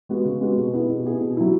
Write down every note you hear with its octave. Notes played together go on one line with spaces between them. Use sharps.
G#3 B3 F#4
C#3
G#3 B3 F#4
B2
B3 E4 G#4
B2
B3 E4 G#4
B2
F#3 E4